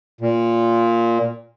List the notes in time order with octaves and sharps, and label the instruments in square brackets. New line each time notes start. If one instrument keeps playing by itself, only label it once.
[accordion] A#2